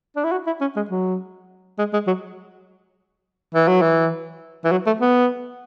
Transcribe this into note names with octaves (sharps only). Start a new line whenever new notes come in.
D4
E4
F#4
E4
C#4
G#3
F#3
G#3
G#3
F#3
E3
F#3
E3
E3
F#3
A3
B3